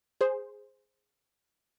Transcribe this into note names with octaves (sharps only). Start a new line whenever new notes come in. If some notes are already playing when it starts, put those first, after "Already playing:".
G#4 C5